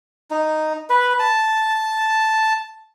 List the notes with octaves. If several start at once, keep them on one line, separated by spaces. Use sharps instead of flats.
D#4
B4
A5